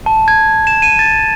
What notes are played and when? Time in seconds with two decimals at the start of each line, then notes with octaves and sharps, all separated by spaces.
0.06 A5
0.28 G#6
0.67 E7
0.82 D#7
0.99 A6